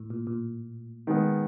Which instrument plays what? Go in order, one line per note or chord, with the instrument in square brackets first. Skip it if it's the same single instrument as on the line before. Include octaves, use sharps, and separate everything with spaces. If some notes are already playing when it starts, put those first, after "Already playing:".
Already playing: [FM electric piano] A2
A#2
A#2
[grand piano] D#3 G#3 B3